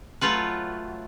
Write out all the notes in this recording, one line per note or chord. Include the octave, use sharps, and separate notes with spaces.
F#3 A3 F4 B4